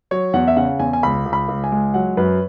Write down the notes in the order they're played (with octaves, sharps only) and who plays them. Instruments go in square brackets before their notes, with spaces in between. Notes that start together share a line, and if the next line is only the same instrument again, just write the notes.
[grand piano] F#3 C#5
E2 F#5
E5
C#3 F#5
E2 G#5
G#5
C#2 B5
C#2
B5
C#2
G#5
G#3
F#3 F#5
F#2 B4